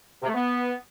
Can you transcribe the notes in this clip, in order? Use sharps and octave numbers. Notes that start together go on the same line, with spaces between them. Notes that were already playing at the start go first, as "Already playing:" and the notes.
C3
A3
B3